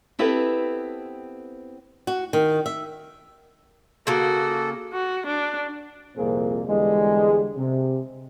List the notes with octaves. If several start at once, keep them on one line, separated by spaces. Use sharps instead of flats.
B3 C4 E4 G4 A4 B4
F#4
D#3
E5
C#3 A#3 F#4 A4
F#4
D4
C2 F2 A#2 A#3 C4 G#4
E2 D3 G3 G#3
C3